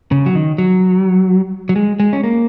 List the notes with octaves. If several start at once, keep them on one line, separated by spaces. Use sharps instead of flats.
C#3
F#3
D#3
F#3
F#3
G#3
G#3
C#4
A#3